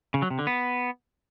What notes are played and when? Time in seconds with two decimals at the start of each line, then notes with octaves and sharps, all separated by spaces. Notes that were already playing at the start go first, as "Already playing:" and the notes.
0.14 C#3
0.22 F#3
0.30 C3
0.39 D3
0.47 B3